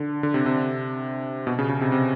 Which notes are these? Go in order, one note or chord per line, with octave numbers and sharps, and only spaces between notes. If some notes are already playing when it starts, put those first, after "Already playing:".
Already playing: D3
D3
C3
C3
B2
C#3
C#3
C3
C3